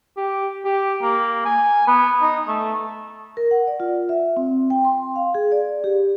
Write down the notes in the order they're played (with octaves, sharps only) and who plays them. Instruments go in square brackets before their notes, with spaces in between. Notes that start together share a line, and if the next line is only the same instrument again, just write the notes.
[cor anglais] G4
G4
A#3
G#5
B3
D#4
A3
[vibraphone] A#4
F#5
D5
F4
E5
C4
G5
C6
F5
G#4
D5
G4